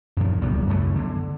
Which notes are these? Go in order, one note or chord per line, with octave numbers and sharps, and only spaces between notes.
F#2 A#2 C#3 F3
D1 C#2 G3 B3
F#2 C#3 A3 B3
D3